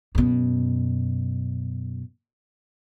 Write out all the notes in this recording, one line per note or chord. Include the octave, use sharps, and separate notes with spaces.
F#2 B2